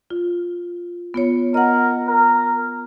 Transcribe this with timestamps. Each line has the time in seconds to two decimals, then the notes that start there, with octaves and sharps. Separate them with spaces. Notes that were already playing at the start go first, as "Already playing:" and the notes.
0.10 F4
1.14 B3 F4 C#5
1.54 A#4 D#5 F#5
2.08 A#4